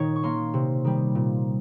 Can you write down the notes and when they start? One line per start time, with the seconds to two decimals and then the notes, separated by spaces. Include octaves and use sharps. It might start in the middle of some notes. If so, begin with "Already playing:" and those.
Already playing: A#2 D#3 D#4 C#5
0.16 C#6
0.23 A#3 C#4 C6
0.54 C3
0.85 D#3 G3
1.15 A#2